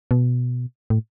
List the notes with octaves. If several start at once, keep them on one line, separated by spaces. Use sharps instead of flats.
B2
A2